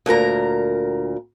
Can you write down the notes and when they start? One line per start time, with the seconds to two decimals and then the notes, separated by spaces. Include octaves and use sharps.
0.06 D2 A#2 A#4 A#5